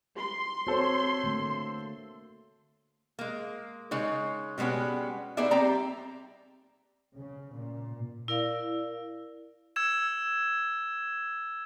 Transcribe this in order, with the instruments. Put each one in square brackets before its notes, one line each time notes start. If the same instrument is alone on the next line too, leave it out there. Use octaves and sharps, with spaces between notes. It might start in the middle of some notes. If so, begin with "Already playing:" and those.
[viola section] C6
[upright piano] C4 A4 C5 [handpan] F#4 C#5
[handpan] D3 A3 A#3
[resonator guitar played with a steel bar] G#3 A#3
C#3 G#3 D#4 C#5
B2 G3 G#3 B3 C#4
A#3 B3 D#4 G#4 D5 E5
G3 C4 G4 D5 A#5
[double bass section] C#3
A#2
[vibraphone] E4 A#4 D5 F5
[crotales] E6 G#6 E7